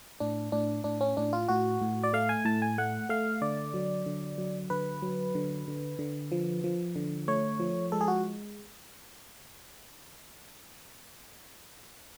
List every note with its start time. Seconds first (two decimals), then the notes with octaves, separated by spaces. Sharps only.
0.20 A2 D4
0.52 A2 D4
0.84 A2 D4
1.01 C#4
1.17 A2 D4
1.33 F4
1.49 A2 F#4
1.81 A2
2.04 D5
2.13 A3 F5
2.29 G#5
2.45 A2 A5
2.62 G#5
2.78 A3 F#5
3.09 A3 F5
3.42 D3 D5
3.74 F#3
4.06 D3
4.38 F#3
4.70 D3 B4
5.02 F#3
5.35 D3
5.68 D3
5.99 D3
6.32 F3
6.64 F3
6.96 D3
7.28 A3 C#5
7.60 F3
7.92 G#3 A4
8.01 G#4
8.08 F#4